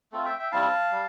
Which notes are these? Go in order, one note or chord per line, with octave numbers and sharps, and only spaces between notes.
A3 C4 F4 A4
E5 G5
E5 G5
G3 C4 E4 F5 A5
G3